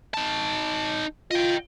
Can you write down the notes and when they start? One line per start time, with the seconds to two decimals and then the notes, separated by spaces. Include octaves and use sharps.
0.14 D#4 A5
1.31 F4 D#5 G5